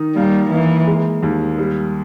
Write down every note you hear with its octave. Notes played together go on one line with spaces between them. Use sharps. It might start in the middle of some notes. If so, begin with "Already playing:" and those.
Already playing: D#3 D#4
G3 A#3
E3 A#3
G#3
D#2
G3